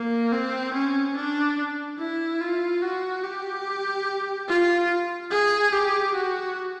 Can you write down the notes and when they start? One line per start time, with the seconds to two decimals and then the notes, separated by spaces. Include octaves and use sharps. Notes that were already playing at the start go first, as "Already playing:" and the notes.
Already playing: A#3
0.33 C4
0.74 C#4
1.16 D4
1.99 E4
2.41 F4
2.82 F#4
3.23 G4
4.48 F4
5.31 G#4
5.73 G4
6.14 F#4